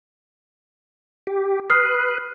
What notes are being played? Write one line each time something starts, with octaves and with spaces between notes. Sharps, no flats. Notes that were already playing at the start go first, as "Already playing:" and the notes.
G4
B4 D#6 F6 C7